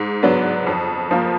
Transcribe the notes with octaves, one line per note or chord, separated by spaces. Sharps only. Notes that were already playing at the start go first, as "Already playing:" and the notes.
Already playing: G#2
F#3 B3 D4
F2
F3 A#3